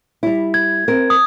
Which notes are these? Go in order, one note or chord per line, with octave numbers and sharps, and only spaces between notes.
G3 E4
G#6
C4 A#4
D#6